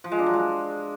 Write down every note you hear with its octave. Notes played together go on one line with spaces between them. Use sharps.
F3
G#3
D4
F#3
G#3